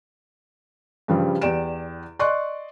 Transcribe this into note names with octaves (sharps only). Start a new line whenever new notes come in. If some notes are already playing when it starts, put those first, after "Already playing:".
G2 C#3 F3 G3
E2 G4 D5 D7 E7
D5 D#5 C6 C#6 F#6